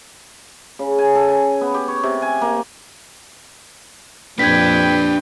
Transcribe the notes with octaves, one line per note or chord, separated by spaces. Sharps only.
C#3
G#5
A4
G#5
B3
G4
C#5
C3
G#5
A#3
F2 A#2 D4 G4 B4 G5 G#6 B6